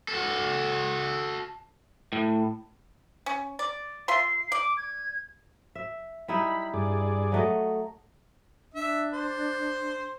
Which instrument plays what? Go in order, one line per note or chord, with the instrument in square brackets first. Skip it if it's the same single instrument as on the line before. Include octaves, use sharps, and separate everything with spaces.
[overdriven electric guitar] F#4 A4
[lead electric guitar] A2
[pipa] C#4
D5
[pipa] F4 E5 C6 [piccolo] C7
[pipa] D5 [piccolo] D6
[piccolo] G#6
[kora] E5
[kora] G3 D#4 E4 [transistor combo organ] B5
[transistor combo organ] G2 G#4 D5
[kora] F#3 A3 D#5
[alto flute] D4 [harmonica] E5
[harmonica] C5